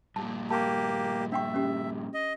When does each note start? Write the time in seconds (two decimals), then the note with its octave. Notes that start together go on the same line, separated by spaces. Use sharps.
0.16 G2 A#2 A5
0.51 A#3 G4 A5 C#6
1.32 D4 E5 G5 C#6
1.54 C#4 G4
2.14 D#5